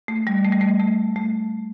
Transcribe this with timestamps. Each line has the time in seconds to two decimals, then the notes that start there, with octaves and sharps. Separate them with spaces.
0.08 A3
0.27 G3
0.44 A3
0.52 G3
0.61 A3
0.80 A3
1.16 A3